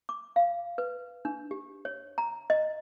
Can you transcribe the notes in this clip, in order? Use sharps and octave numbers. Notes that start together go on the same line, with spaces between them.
D6
F5
B4
D4
G4
C#5
A#5
D#5